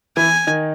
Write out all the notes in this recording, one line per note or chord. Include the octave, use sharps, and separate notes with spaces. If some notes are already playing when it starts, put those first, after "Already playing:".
E3 E4 G#5
D#3 D#4